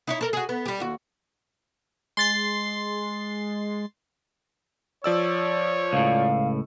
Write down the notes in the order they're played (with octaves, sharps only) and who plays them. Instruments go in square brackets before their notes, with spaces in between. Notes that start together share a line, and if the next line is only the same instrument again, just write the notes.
[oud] D#4 E4 C#5
A4 A#4
F#4 G#4
B3
G3 G4
D#2 F#4
[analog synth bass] G#3 [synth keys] C6 A6 C7
[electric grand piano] F3 D5 E6 [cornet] C#5
[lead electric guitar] C#2 A2 [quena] F5